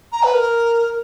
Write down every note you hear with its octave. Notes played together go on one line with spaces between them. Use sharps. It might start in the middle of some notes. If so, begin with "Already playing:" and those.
A#5
B4
A#4